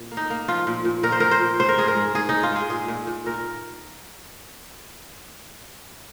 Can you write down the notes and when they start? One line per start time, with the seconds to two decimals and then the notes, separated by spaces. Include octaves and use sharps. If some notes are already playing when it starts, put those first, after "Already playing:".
Already playing: A#2
0.11 A#3
0.17 D#4
0.30 A#3
0.48 F3 F4
0.67 A#2
0.85 A#2
1.03 A#2 A#4
1.12 C5
1.20 A#2 A#4
1.31 C5
1.40 A#2
1.59 G#2 C5
1.68 A#4
1.78 G#2 G#4
1.88 A#4
1.97 G#2
2.15 G#2 G#4
2.29 D#4
2.34 G#2
2.43 F4
2.52 G#3 G#4
2.70 A#2 G#4
2.88 A#2
3.07 A#2
3.26 A#2 A#4